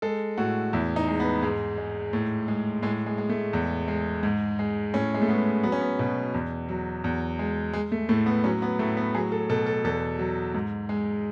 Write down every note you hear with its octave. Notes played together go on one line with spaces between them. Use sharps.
G#3 A4
A2 F#4
E2 E4
D#4
G#3
B3
G#2 G#3
G#3
A2
G#3
A2 G#3
G#3
G#3
A3
E2
G#3
G#2
G#3
A2 C#4
G#3
A3
G#3 B3
F#3 B3
C#4
B3
B2
E2
F#3
E2
G#3
G#3
A3
A2 A3
B3
F#3 C#4
B3
A2 A3
B3
F#3 G#4
A4
B2 A4
A4
E2 A4
F#3
G#2
G#3